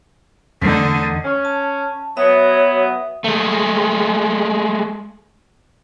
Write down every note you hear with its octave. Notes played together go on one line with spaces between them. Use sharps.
E2 D3 A3 D#4
C#4
A5
F#3 B3 C#5 E5 D#6
G#3 A3